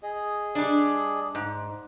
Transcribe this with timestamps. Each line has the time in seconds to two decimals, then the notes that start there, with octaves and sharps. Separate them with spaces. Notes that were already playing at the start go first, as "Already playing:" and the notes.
0.03 G#4 D#5
0.55 G3 D4
1.35 G#2